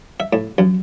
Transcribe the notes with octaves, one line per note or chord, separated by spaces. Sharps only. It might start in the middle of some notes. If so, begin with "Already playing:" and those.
E5
A2
F#2